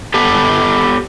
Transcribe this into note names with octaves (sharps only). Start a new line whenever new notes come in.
B3 G4 A4 B4